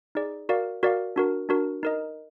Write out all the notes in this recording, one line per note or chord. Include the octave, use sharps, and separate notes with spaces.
D#4 G#4 D5
F#4 A#4 D5 F5
F#4 A#4 D5 F5
D4 F#4 A#4
D4 F#4 A#4
D#4 A#4 D#5